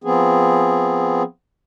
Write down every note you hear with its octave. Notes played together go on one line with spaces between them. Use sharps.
F3 B3 C4 G#4